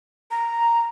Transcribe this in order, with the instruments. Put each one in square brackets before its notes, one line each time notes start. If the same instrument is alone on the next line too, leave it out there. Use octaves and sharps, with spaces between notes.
[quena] A#5